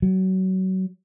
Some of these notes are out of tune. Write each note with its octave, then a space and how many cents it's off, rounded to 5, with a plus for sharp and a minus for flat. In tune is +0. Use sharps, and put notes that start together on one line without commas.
F#3 +25